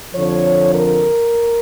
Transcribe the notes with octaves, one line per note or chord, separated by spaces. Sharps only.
F2 D3 F3 C#5
A#4